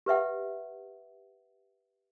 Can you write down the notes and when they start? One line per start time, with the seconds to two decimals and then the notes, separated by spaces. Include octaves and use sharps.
0.06 G4 B4 E5 F#5